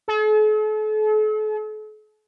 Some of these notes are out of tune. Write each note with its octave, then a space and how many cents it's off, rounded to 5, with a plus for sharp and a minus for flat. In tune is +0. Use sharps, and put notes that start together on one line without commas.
A4 -45